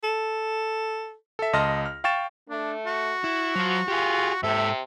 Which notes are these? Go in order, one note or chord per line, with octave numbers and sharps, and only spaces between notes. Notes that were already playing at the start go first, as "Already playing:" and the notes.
A4
A4 E5
C#2 D#5 A5 C6 F6 A#6
F6
F5 G5 C#6 A6 E7
A3 D4
F#4
E4
F3 F#3
F4 G4 G#4
G#2 C3 A4 E5